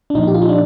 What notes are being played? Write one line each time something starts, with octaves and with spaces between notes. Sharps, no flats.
D4
A#2 F3 D#4
G4
F4
D#4
D4